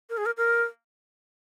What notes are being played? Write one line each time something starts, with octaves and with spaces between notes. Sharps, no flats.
A#4
G#4
A#4
A#4